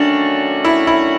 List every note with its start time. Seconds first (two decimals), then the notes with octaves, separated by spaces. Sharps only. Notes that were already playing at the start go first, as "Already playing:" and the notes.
Already playing: D#3 F#3 A3 C#4 D4 F#4
0.65 E4
0.87 E4